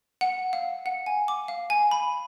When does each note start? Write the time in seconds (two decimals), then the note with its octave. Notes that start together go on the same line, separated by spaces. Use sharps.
0.21 F#5
0.53 F5
0.86 F#5
1.06 G#5
1.28 D6
1.48 F5
1.70 G#5
1.91 B5